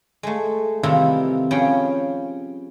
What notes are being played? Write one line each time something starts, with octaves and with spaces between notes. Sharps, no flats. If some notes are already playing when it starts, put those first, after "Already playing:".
G#3 A3
C3 D#3 E3 G3 E4 F4
F3 C#4 G#4 G5 B5